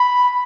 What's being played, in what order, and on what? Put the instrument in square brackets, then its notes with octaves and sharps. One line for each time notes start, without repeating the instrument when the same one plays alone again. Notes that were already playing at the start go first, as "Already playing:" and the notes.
Already playing: [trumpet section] B5